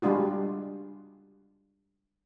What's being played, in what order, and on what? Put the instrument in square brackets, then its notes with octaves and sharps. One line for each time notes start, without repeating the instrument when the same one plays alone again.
[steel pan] G3 G#3 D4 F4 F#4